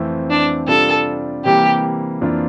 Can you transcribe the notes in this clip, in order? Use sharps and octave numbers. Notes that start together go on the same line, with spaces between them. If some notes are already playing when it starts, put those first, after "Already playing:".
Already playing: F2 E3 A3 C4
D4
C3 G3 D4 F4 A4
C3 E3 G3 A#3 G4
F2 E3 A#3 D4 F4